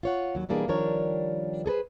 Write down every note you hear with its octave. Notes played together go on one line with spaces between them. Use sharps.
F4 C#5 F#5
D#2 F#3
B2 E3 G3 A#3 D4 G#4
D#3 F3 G3 D4 A#4 C#5
G#4 A4 B4 C5